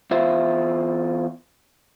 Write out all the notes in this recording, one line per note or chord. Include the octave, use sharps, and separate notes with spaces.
E2 F4 C5 E5